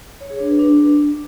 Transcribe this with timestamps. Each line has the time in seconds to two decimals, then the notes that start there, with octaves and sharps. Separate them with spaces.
0.20 C#5
0.30 G#4
0.40 D4
0.50 B4
0.59 D4